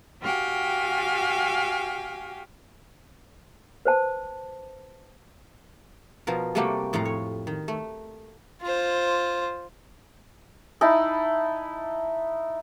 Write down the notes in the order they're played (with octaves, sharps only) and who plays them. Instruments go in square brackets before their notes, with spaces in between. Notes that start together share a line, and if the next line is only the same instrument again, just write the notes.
[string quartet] F#4 G4 F5 G5 G#5
[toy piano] B4 C5 A5
[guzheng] B2 F3 A#4
C3 G3 A3 A#3 F#4 G4
F2 A2 F3 F5 A#5
C#5
D#3
A3
[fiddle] F4 C5
[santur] D#4 E4 A5 B5